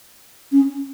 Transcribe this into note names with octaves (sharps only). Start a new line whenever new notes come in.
C#4